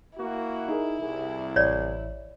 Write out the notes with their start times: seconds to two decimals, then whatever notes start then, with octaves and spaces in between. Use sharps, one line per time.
0.18 A#3 E4 F#4
0.68 D#4 G#4 A#4
1.02 C2 G#4
1.56 A1 C#5 D5